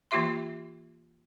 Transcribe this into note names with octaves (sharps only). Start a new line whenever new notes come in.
E3 A#3 F4 G4 E5 C6